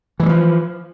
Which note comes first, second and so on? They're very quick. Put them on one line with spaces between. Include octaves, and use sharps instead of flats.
E3 G#3 G3 F3